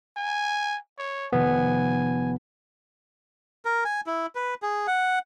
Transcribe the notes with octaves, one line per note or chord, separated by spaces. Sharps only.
G#5
C#5
F1 D#3 B3 G#5
A#4
G#5
E4
B4
G#4
F#5